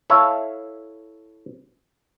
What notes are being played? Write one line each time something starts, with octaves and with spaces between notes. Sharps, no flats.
E4 A4 C#5 E5 F5